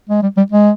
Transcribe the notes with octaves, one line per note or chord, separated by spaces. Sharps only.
G#3
G3
G3
G#3